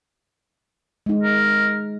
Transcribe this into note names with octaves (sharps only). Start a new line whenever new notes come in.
G#3 D#4
A#4